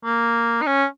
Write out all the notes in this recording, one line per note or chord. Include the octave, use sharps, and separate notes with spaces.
A#3
D#4
C#4